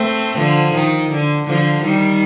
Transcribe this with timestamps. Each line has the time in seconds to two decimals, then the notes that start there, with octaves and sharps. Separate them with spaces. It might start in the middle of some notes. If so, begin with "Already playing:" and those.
Already playing: A3 C4
0.38 D3 F3
0.74 D#3
1.11 D3
1.47 D3 F3
1.83 D#3 G3